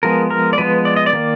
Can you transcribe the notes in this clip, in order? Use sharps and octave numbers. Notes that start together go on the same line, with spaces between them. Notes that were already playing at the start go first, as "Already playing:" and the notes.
F3 G#3 B3 A#4
A#4
D5
F3 G#3 B3 B4
D5
D#5
D5
D#3 A#3